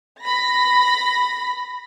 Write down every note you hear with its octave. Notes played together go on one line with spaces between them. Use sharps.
B5 A#6